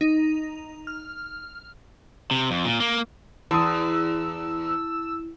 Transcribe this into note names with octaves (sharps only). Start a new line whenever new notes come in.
D#4
F6
C3
F2
A#2
A#3
E2 E4 A5 D#6 E6